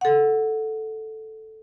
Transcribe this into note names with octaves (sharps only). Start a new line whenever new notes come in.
A4 F#5